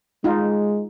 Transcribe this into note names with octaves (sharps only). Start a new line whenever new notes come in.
G#3 D#4 F4